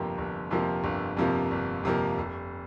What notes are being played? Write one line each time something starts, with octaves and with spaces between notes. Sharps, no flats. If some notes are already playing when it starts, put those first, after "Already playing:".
Already playing: G1 F2 C3 F3 A#3
G1
F2 C3 F3 A#3
G1
F2 C3 F3 A#3
G1
F2 C3 F3 A#3
F1